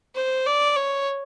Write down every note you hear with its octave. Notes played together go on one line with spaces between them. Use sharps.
C5
D5
C#5